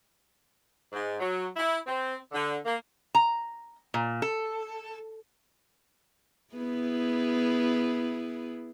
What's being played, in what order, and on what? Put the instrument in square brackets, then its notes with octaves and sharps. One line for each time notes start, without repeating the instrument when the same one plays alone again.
[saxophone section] G#2
F#3
E4
C4
D3
A#3
[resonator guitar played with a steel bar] A#5
A#2
A4
[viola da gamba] B3 E4 G#4